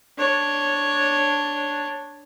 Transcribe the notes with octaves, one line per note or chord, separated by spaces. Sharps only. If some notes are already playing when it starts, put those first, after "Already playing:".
D4 C#5